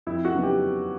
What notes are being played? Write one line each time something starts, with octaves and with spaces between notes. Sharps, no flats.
F2 E4
F#4
C#3 F#3 B3 D#4
G4